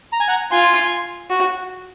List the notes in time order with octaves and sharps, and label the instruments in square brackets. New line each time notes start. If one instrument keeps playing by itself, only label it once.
[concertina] A#5
G#5
F#5 A#5
[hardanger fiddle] F4 [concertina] G#5 C6
[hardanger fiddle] F#4